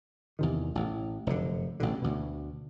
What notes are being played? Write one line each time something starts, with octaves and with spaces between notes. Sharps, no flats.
E2 C3 D#3
A1
F1 F#2 D3
A1 B2 D3
D2 B2